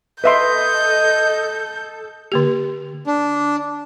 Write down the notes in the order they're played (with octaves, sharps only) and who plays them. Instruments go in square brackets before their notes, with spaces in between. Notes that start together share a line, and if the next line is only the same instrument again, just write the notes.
[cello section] A4 [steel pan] B4 E5 C6 [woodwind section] D#5 [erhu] G6
[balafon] D3 A#3 G4
[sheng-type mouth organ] D4